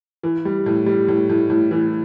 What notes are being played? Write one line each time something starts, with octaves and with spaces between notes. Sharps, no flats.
E3
G3
A2
G3
A2
A2
A2
E3